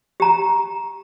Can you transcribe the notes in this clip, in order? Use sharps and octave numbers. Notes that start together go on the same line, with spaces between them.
G4 A#5